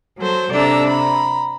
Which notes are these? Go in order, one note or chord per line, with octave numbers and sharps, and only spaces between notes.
F#3 A4 C5
C3 D4 A4 D5 A#5 E6
A#5 B5